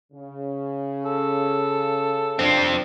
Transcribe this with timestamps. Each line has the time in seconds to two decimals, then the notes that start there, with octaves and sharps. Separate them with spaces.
0.13 C#3
1.05 A4
2.39 C3 F3 C4 D4